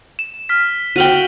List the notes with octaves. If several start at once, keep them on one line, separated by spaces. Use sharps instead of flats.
E7
F6 B6
F#4 F5 G5 D#7 F#7 G7